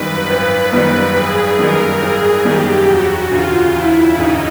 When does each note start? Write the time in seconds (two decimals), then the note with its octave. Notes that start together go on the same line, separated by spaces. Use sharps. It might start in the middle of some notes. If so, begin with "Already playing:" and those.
Already playing: G#1 F#2 D#3 G3 B4
0.30 G#1
0.73 F#2 D#3 G3
1.16 G#1 G#4
1.58 F#2 D#3 G3 A#4
2.02 G#1 G#4
2.45 F#2 D#3 G3 G4
2.88 E1 F#4
3.31 D2 C#3 F4
3.74 E1 E4
4.17 D2 C#3 D#4